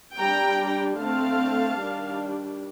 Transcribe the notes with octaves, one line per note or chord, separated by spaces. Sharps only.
G3 D4 G5 A#5
D3 A3 C4 F5 A5
D#3 G3 D4